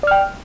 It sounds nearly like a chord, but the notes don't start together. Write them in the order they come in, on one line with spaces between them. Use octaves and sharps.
D5 F6 G5